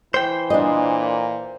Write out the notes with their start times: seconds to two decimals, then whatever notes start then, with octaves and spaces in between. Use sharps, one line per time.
0.14 E3 C5 G5
0.50 A#2 D4 D#5